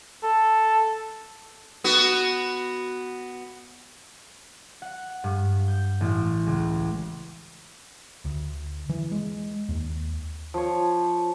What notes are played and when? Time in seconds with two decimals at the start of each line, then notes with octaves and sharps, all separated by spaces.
0.23 A4
1.84 B3 F#4
4.82 F#5
5.24 G2
5.68 G6
6.01 A1
6.47 C#2
8.25 D2
8.89 E3
9.12 G#3
9.69 D#2
10.54 F3 C#5